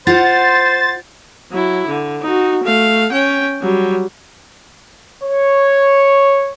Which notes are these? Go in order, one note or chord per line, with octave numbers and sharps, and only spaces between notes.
F4 C5 F#5 A6
F#3 E4
D3
D#4 F#4
A3 F5
C#4 G5
F#3 G3
C#5